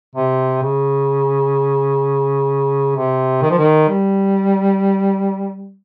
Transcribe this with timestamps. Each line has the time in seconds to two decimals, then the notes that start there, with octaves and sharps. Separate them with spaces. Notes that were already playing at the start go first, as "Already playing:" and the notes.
0.16 C3
0.62 C#3
2.96 C3
3.42 D#3
3.50 F3
3.58 D#3
3.89 G3